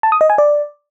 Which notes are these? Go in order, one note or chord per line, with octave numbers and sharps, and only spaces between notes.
A5
D#6
D#5
G#5
D5